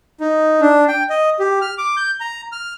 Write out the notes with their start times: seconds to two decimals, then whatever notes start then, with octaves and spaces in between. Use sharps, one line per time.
0.20 D#4
0.61 D4
0.88 G5
1.10 D#5
1.39 G4
1.61 F6
1.78 D6
1.97 G6
2.20 A#5
2.52 F6